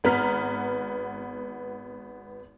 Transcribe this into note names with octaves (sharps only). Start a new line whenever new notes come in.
G#1 B3 A#5 F6 B6